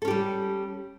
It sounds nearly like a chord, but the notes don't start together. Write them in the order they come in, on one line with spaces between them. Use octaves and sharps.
A4 C#4 G4 G3